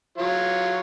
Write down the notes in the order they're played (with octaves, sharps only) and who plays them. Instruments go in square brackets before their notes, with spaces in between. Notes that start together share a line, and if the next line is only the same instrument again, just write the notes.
[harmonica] F#3 F4 C#5